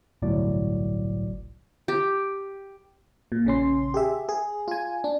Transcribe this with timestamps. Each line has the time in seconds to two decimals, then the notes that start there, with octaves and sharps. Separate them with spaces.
0.22 G1 C2 A2 F#3 D5
1.88 G4
3.32 A#2
3.45 A#1 C#3 C#4 C6
3.94 G4 G#4 E5
4.29 G#4
4.68 F4 G#5
5.04 D4